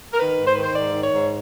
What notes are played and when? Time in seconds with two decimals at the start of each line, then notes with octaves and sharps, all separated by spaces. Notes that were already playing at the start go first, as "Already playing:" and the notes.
0.13 A#4
0.20 D#3 B4
0.39 G#2
0.47 C5
0.55 D#3 B4
0.63 C5
0.76 G#2 D5
0.94 D#3
1.03 C#5
1.13 G#2